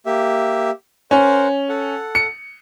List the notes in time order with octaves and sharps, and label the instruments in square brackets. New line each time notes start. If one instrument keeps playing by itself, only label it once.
[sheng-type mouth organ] A#3 G4 E5
[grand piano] C#4 [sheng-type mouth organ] A#4 C5 F#5
[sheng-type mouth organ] A4 F#5
[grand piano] C#7